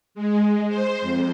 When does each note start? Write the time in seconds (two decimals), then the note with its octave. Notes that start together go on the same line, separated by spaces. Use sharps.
0.15 G#3
0.68 C5
1.01 F2